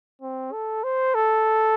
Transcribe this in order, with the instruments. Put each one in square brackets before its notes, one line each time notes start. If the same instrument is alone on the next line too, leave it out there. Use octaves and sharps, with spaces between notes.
[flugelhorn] C4
A4
C5
A4